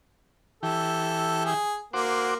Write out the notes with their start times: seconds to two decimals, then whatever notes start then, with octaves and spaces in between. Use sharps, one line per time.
0.63 E3 G4 A4
1.46 G#4
1.93 A#3 F#4 C5 D6